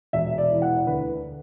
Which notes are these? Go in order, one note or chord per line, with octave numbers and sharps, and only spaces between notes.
E1 E5
D5
E3
F#5
D2 B4